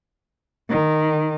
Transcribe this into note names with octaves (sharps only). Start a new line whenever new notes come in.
D#3